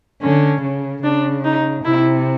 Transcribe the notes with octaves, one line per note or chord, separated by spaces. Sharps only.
D3 C#4
C#3
C#3 D4
D#4
C3 E4